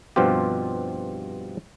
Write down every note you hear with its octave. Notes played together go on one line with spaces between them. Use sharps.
G2 B2 F3 C4 F4 G4